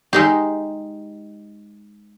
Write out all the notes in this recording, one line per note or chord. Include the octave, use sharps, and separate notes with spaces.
G#3 D#4 G4